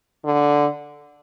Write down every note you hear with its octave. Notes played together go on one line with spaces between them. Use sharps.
D3